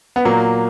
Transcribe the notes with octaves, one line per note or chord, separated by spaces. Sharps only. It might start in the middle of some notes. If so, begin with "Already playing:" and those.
B3
A#2 F#3 A#3